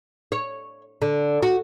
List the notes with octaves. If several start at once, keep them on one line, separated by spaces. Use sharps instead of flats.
C#5
D3
F#4